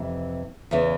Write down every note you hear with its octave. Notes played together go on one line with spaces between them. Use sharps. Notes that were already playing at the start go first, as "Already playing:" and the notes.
Already playing: F2 C3 E3
E2 C#3 E3